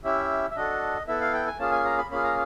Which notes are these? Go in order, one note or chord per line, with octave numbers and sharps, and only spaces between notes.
C#4 E4 G4 E5
E5
D4 F#4 A4 D#5
B3 E4 A4 E5
F5
G5
G#5
A#3 C#4 F4 G#4 A5
G#5
A#5
B5
A#3 C#4 F4 G#4 B5
A#5